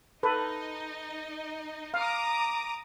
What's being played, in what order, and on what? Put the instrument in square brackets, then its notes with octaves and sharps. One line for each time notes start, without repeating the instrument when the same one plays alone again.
[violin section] D#4 D#5 [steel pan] A4 B4
[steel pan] F5 [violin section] A#5 D6 D#6